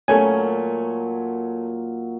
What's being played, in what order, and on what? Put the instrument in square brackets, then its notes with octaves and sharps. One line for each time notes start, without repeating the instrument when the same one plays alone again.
[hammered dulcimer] A#2 F#3 [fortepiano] A3 C#4 G#5